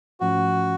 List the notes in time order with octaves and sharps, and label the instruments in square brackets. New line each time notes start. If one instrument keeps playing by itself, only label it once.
[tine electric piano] G#2 F3 A3 C#4 [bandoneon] F#4